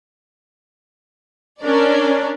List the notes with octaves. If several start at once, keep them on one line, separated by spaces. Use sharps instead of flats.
C#4 D4 A#4 D5